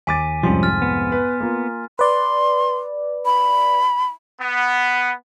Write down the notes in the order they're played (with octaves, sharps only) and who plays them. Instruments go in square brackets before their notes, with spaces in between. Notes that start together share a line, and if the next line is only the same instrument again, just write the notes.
[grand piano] D#2 D6 A6 [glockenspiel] G#5 B6 D#7
[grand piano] C2 F2 G#2 [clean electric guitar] F3 G3 C#4 [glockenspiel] C6
[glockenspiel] F6 A6
[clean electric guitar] B3
[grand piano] B4
A#3 F4
[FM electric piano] B4 D5 [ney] C6
[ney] B5
[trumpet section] B3